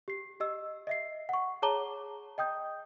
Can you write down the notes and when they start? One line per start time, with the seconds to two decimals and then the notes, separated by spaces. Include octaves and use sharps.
0.08 G4 C7
0.40 G4 D#5 E6
0.87 D#5 E5 C7
1.29 F#5 C#6
1.62 G#4 C#5 A5 A#5 D6 G7
2.38 D#5 G5 D#6 G6